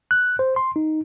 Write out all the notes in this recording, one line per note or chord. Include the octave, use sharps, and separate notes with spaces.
F#6
C5
C6
D#4